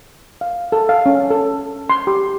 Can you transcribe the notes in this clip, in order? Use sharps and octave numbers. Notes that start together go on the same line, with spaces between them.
F5
A4
F5
C#4
A4
C6
G4